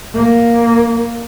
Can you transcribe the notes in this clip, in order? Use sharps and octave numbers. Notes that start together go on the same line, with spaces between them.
A#3